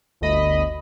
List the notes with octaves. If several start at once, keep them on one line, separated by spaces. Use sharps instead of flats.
G1 D2 D#5 B5